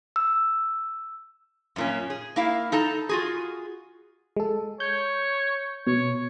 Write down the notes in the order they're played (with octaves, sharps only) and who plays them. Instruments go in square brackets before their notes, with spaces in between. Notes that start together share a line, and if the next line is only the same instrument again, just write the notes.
[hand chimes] E6
[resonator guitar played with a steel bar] F#2 A#2 C#4
G#4
A#3 E4 F5
D#4 A4 A#5
F4 F#4 G#4
[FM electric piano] G#3 A4
[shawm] C#5 [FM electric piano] G6
[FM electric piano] B2 [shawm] C#5